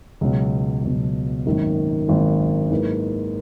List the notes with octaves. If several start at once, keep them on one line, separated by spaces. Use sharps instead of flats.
C#2 B2 F#3
C#2 B2 F#3
G#1 F#2 D#3 A#3
G#1 F#2 D#3 A#3
G#2 F#3 A#3 E4 B4